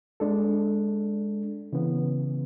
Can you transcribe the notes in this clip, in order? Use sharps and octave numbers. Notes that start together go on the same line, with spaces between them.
G#3 D4 A4
C#3 E3 B3